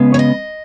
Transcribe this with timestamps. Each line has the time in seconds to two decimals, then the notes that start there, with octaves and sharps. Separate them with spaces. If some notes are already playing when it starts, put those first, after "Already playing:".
Already playing: C#3 G#3 B3
0.14 C#5
0.19 D#5